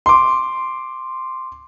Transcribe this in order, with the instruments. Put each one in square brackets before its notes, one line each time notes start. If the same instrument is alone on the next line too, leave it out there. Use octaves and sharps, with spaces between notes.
[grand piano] C6 D6